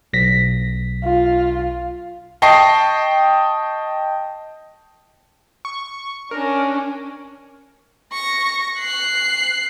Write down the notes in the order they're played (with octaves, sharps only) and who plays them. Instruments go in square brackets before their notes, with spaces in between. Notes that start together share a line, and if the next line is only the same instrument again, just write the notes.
[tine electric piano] B1 A#6 B6
[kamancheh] F4
[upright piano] D#5 G5 A5 C#6 C7
[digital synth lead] C#6
[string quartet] C#4 D4 [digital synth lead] A#4
[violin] C#6 A#6
F#6 C7